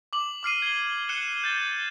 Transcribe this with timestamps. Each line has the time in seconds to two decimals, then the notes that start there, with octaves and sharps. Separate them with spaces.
0.13 D6 F#7
0.43 D6 F6 C7 D#7
0.62 G#6 C7 G7
1.09 F#6 C#7 E7 G7
1.44 G6 A6